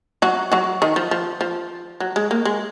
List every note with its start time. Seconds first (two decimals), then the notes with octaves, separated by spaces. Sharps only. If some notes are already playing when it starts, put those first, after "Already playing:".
0.22 F#3 F#4
0.52 F#3 F#4
0.82 D#3 D#4
0.96 F3
1.11 F3
1.41 F3
2.00 F#3
2.16 G#3
2.31 A#3
2.45 G#3